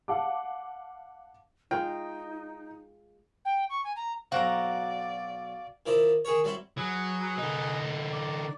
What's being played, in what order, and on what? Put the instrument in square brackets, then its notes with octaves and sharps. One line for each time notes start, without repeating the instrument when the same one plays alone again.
[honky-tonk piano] F5 F#5 A5 D6
[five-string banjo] G#3 F4 [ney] D#4 [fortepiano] G5
[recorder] G5
C#6
G#5
A#5
[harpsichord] B1 C4 C5 [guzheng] F#4 A#5 [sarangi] D5 [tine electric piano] F5
[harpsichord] D#3 F3 E4 D5
D#3 G#4 A#4 C#5
F#3 G3 C4 E4
[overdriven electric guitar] F#3 [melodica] G#4 B4
[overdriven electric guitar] D3 D#4
[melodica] D5